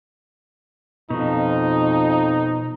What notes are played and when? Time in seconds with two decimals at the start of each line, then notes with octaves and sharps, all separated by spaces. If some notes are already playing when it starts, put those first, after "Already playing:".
1.10 F2 B2 F3 D#4